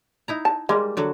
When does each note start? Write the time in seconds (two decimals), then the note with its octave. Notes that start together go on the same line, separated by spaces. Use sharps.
0.28 D#4 E4 A#5
0.45 A5
0.69 G3 G#3 A#3
0.97 D3 F#3 F#4